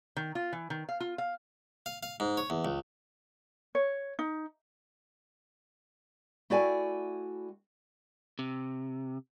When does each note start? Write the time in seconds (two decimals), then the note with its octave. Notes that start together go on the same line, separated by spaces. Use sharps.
0.17 D#3
0.35 F4
0.53 E3
0.70 D#3
0.89 F5
1.00 F4
1.18 F5
1.86 F5
2.03 F5
2.20 G#2
2.37 C#5
2.50 E2
2.65 C#2
3.75 C#5
4.19 D#4
6.50 A3 E4 F#4 D5 G5 G#5
8.39 C3